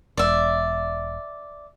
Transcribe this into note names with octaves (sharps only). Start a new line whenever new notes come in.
E1 D5 E5